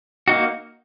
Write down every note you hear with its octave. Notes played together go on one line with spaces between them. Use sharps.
A#3 D#4 F#4